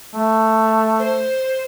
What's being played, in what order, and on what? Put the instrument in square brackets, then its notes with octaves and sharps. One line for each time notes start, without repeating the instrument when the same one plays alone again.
[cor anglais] A3
[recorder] C5